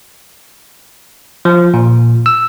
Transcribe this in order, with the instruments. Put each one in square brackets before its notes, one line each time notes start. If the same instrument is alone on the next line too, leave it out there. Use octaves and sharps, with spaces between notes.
[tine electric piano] F3
A#2
E6